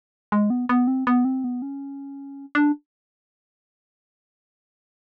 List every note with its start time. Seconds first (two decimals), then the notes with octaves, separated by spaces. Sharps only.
0.32 G#3
0.50 B3
0.69 B3
0.87 C4
1.07 B3
1.25 C4
1.44 B3
1.62 C#4
2.55 D4